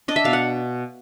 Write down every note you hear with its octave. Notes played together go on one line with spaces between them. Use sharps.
D4 D#5
E5
B2 F5
F#5